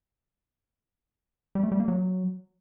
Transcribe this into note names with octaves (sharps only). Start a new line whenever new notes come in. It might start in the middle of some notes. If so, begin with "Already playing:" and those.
G3
A3
G3
A#3
F#3